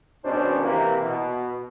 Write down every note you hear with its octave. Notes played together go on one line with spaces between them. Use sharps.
G#1 B2 C#4 D4 C5
C3 E3 A#3
B2